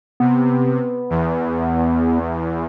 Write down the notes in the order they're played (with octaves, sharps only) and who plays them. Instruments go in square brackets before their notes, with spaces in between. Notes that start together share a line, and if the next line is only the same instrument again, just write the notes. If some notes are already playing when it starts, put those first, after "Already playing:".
[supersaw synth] C3 [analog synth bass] B3
[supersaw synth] E2